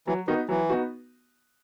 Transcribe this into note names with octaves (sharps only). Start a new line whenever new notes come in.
E3 F#3
D#3 B3 D#4 F#4
E3 F#3
B3 D#4 F#4